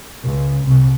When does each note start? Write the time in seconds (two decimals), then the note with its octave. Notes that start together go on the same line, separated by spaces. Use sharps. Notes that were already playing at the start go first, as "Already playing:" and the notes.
0.23 C#2
0.65 C2